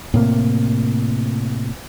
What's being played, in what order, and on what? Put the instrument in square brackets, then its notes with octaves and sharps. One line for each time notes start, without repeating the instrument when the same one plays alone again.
[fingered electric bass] A2 C3 A#3